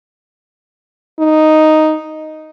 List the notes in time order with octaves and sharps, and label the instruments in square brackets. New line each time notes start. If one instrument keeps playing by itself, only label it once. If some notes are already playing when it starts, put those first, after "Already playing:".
[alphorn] D#4